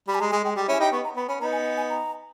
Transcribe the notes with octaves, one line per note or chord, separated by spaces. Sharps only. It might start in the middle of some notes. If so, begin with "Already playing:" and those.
G3 B5
G#5
G#3 A#5
G#3 G#5
G#3 G5
G3 G5
C#4 E4 G#5
D#4 G4 B5
B3 C#6
A#5
B3 B5
C#4 B5
B3 D#4 A#5
G#5
G#5
A#5